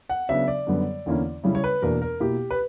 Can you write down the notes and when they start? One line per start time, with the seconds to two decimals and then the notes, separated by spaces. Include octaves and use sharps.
0.09 F#5
0.29 C#3 F#3 B3 D4 E5
0.48 D5
0.67 F#2 D3 G3 B3
1.06 E2 D3 A#3 C#4 E4
1.44 C#3 G3 C#4 E4
1.55 C#5
1.64 B4
1.82 E2 B2 A#3 D4 A#4
2.02 A#4
2.20 B2 A#3 E4 G4
2.51 B4